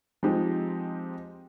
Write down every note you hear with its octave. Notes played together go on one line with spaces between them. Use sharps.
F3 G#3 C4 D#4 G4